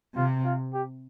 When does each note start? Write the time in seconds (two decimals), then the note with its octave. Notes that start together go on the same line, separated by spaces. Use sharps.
0.17 C3 F4
0.45 F4
0.74 G4